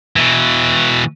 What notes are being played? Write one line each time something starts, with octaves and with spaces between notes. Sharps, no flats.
B2 E3